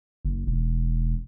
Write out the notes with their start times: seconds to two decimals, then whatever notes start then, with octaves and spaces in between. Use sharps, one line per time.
0.25 F#1
0.47 E1